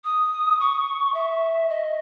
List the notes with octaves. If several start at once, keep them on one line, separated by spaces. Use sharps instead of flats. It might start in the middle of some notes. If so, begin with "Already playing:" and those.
D#6
C#6
E5
D#5